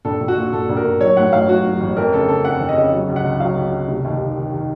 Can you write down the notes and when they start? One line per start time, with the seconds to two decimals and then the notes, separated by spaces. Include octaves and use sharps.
0.05 A#1 A4
0.20 A#1
0.28 F#4
0.37 A#2
0.53 A#2 A4
0.69 A#1
0.77 A#4
0.85 A#1
1.01 F#3 C#5
1.16 A2 F#5
1.33 A1 F5
1.48 F#3 F#4
1.64 F#3
1.80 A1
1.97 F2 A#4
2.12 C#3 A4
2.28 C#3 A4
2.45 F2 F#5
2.60 F2
2.69 D#5
2.76 C#3
2.92 F#3
3.08 C#2
3.16 F#5
3.24 C#2
3.40 F#3 F5
3.56 C#2
3.72 C#2
3.88 F1
4.04 D#2
4.20 D#3
4.36 D#3
4.52 D#3